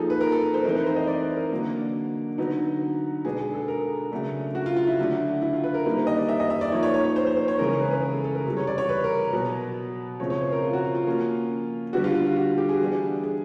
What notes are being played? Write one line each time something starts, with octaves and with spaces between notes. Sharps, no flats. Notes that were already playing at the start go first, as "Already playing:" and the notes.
Already playing: F3 A#3 D#4 G#4 A4
B4
A#4
A4
A#4
C5
E3 A3 C4 D#4 A#4
B4
C5
D#5
D5
B4
A#4
D3 F#3 A#3 D4
D3 F#3 B3 D#4
B2 G#3 B3 D4 G#4
G#4
A4
A#4
C#3 F#3 A3 D4
F#4
F4
F4
E4
D3 F#3 A3 D4
E4
F4
B4
A#4
D#3 G3 A#3 D#4 B4
C5
D#5
D5
E5
D#5
E5
D5
F3 A#3 D#4 C#5
C#5
C#5
C#5
C5
C5
C5
C#5
C#3 E3 G#3 C#4 A#4
G#4
B4
B4
G#4
A4
A4
A#4
C3 E3 G3
C#5
D5
C#5
B4
A#4
B2 F#3 B3
C#3 F3 A3 C4 C#5
C#5
C5
A#4
F4
F#4
F4
F4
F3 A#3 C#4
D3 G3 B3 D4 F#4
F4
F4
F4
F#4
G4
G#4
E3 G3 B3 D4
G#4